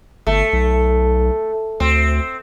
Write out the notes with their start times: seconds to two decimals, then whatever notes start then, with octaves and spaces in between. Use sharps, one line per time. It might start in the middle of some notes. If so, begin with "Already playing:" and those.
0.27 G1 A3
0.53 B1
1.80 D2 C4